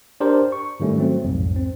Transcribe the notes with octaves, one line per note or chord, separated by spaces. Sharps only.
D4 G4 A#4 C5 D5
C#6
G#2 D#3 G3 A3 C#4
F#3 A3 C4
B1 F2 G#2
C4